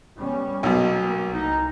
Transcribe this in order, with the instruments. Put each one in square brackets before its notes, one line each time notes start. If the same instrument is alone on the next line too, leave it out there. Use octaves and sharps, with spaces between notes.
[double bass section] G3 B3 C#4
[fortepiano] B1 B2 [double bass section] A#3
[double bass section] C2 [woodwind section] D#4